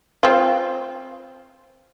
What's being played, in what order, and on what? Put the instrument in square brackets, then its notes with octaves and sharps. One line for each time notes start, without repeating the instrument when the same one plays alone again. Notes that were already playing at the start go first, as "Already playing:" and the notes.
[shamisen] C4 F4